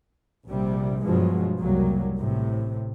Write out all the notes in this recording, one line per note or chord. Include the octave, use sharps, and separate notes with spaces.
A#1 C3 G3
G2 B2 F3 F#3 G#3
F1 C2 F#3 G3 A#3
A1 A2 C3